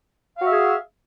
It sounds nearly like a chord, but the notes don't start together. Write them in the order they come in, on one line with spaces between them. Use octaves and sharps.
F5 F#4 E5 G#4